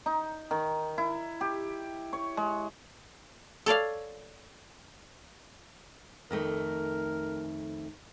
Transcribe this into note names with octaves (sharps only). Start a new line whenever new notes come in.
D#4
D#3
E4
G4
C#5
G#3
A4 C#5 D5 F5
F2 D#3 A3 A#4